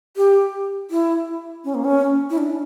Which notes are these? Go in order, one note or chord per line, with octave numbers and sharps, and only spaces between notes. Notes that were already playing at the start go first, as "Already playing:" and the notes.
G4
E4
C#4
A#3
C#4
E4
D4